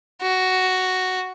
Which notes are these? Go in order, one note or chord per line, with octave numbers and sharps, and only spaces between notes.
F#4